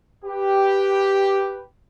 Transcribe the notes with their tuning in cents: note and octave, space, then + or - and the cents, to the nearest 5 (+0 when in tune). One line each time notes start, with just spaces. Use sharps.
G4 +0 B4 +0